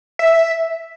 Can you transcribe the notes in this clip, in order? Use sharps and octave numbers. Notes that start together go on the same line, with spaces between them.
E5